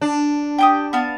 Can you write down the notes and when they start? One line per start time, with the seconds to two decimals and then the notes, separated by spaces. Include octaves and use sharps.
0.01 D4
0.58 G4 G5 D#6
0.93 B3 F5 A5